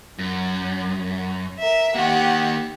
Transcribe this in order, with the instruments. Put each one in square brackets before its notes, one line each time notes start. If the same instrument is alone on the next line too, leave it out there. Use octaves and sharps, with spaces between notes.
[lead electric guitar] F#2
[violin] A#4 E5
[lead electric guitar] D#3 A#3 [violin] G4 F#5